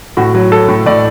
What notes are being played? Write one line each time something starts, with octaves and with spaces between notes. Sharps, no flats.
A2 F#4
F#3
F#3 A4
A2
A2 D5